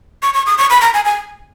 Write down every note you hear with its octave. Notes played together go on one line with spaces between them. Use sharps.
C#6
C#6
D#6
C#6
B5
A#5
G#5
G#5